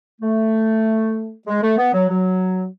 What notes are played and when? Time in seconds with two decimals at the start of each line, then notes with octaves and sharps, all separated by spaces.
0.21 A3
1.47 G#3
1.62 A3
1.77 B3
1.93 F#3
2.09 F#3